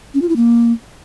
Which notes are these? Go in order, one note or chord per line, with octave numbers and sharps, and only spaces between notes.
C#4
F4
E4
A#3